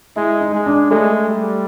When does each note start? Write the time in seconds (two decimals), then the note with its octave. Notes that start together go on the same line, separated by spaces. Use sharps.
0.16 G#3 E4
0.41 D#4
0.54 G#3
0.66 D4
0.91 G#3 A3
1.29 G3